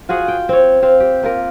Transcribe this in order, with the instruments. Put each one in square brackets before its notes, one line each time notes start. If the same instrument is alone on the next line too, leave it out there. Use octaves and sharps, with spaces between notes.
[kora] F4 F#4 G#4 F#5
G5
C4 C#5
C4 F5
G4
A#3 F4 A#4